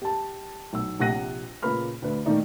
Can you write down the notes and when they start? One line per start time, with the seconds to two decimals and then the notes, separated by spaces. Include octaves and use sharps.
0.02 G4 A5
0.73 B1 E6
1.00 A#1 C3 F#5 F#6 A#6 D#7
1.62 A#2 C#3 A#3 B4 B5 F6
2.02 D2 D4 B4
2.26 D#3 A3 A#3 D#4 D5